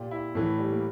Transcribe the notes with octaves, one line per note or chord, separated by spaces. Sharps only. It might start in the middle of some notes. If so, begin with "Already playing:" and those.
Already playing: A#2 G4
E4
A2 E3 A3
G3
A#3